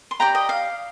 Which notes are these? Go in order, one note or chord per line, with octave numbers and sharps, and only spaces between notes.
C6
G4 D5 G5 A#5
D#5 G5
F5